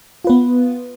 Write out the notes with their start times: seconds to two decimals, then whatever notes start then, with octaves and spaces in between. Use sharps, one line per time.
0.25 F4
0.27 B4
0.30 B3